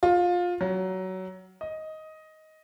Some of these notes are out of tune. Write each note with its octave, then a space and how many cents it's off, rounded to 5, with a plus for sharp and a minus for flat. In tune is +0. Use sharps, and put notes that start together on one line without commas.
F4 +20
F#3 +20
D#5 +10